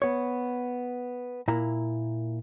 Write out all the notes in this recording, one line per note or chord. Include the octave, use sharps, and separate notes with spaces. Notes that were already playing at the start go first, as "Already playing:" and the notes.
B3 C#5
A#2 A#3 E4 A#5